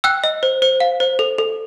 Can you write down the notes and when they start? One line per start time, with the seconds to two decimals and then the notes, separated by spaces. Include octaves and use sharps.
0.04 G5 E6 F#6
0.24 D#5
0.43 C5
0.62 C5
0.80 F5
1.00 C5
1.19 A4
1.38 A4